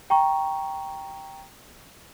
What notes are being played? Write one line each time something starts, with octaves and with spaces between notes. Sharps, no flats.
G5 A#5 C#6